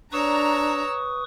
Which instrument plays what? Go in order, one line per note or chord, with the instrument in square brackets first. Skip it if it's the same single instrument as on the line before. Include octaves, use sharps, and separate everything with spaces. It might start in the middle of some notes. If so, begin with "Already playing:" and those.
[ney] D4 [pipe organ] B4 C#6 D#6 [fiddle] C#5 E6 [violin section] A#5